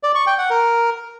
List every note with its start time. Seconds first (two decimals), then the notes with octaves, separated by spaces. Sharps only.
0.03 D5
0.15 C#6
0.27 G5
0.38 F#5
0.50 A#4